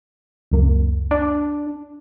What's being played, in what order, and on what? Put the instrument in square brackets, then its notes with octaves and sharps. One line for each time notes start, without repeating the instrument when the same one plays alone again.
[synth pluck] C#2 F#2 A#3
[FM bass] D4